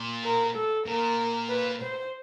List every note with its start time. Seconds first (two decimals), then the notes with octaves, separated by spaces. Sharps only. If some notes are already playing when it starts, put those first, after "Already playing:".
Already playing: A#2
0.24 A#4
0.55 A4
0.86 A#2 A#4
1.49 B4
1.81 C5